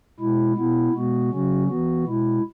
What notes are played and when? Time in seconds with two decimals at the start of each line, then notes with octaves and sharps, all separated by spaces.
0.20 B2 G#3 E4
0.56 B2 B3 E4
0.93 B2 G#3 B3 F#4
1.31 C#3 F#3 C#4 F#4
1.67 E3 B3 F#4
2.04 B2 G#3 E4